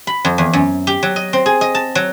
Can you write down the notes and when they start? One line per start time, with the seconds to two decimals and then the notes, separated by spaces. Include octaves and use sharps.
0.07 B5
0.25 F2
0.38 E2
0.53 F#2
0.87 G4
1.03 F#3
1.16 D#5
1.33 C4
1.46 G#4
1.61 D#5
1.75 A5
1.95 F#3